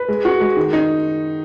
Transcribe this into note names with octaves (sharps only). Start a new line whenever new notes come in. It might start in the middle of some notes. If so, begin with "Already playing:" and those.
Already playing: B4
G#3
F#4
G#3
D#3
D#4